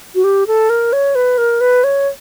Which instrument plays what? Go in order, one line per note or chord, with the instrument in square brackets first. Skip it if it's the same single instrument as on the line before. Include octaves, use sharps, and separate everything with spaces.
[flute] F#4
G4
A4
A#4
C#5
B4
A#4
B4
C#5